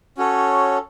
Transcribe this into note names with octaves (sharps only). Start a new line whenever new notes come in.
C#4 F#4 A4 C#5